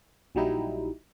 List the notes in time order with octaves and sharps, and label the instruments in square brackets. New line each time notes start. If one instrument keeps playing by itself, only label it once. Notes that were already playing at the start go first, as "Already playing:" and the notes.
[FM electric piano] A#1 F#3 G3 D#4 E4